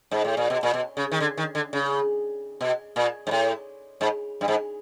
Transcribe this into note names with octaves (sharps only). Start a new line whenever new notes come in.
G#2
A2
A#2
B2
A#2
B2
C#3
D#3
D3
D#3
D3
C#3
B2
A#2
G#2
A2
G#2
G2
G#2